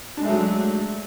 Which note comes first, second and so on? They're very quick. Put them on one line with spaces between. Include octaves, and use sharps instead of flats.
D4 G#3 A3 F#3